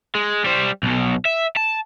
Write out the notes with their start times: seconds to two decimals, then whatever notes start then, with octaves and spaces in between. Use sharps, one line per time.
0.15 G#3
0.44 G3 C5
0.83 B1 B2
1.25 E5
1.57 A5